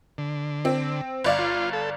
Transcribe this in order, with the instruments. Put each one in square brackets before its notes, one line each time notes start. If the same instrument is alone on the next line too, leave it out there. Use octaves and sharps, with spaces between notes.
[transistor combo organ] D3
[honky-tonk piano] C4
G1 D5 F5
[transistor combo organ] F4
A4